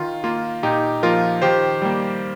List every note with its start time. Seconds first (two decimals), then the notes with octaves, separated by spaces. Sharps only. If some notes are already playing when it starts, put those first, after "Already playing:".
Already playing: D#3 F4
0.24 A#3 F4
0.63 A#2 D#4 G4
1.03 F3 A#3 F4 A#4
1.42 D#3 G4 C5
1.82 G3 A#3